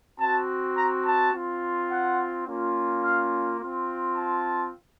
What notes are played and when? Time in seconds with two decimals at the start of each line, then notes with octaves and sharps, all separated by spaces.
0.19 C4 F#4 A5
0.75 A#5
1.05 A5
1.33 C4 F4
1.90 F#5
2.46 A#3 C#4 F4
3.02 F5
3.59 C4 F4
4.15 A5